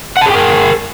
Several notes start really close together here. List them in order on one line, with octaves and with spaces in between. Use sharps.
F#5 A5 G#4 G5 A#4